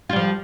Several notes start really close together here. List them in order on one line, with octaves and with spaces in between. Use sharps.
F4 G3 F3